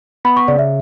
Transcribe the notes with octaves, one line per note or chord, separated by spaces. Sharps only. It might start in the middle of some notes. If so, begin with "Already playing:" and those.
B3 B5
C#6
C#3 D5
E5